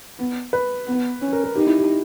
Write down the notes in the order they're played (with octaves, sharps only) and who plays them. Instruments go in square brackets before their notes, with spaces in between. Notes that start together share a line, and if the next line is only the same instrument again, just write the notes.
[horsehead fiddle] B3
[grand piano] B4
[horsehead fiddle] B3
C#4
[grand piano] A#4
A#4
[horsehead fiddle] D#4 [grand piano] G4
[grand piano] E4
G4